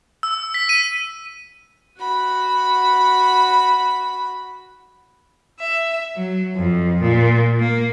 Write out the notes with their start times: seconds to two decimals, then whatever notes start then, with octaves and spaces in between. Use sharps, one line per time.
0.23 E6
0.54 B6
0.69 D#7
1.98 F#4 B5
5.60 E5
6.16 F#3
6.56 F2
7.00 A#2
7.58 A#3